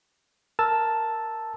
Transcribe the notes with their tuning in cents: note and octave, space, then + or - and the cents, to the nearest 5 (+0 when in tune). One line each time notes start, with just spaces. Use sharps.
A#4 +0 A5 +0 E6 +0